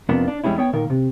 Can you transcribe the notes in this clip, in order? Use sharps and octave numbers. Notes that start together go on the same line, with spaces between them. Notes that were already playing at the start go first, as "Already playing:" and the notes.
F2 C3 A#3 B3 D4 F4
D4
E2 G3 G#3 C#4 E4
B3 C#5 G5
A#2 D#3 A#4
C3